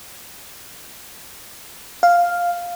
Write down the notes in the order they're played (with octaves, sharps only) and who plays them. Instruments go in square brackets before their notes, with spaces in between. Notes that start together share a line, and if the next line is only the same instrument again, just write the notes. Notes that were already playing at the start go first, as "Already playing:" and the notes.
[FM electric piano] F5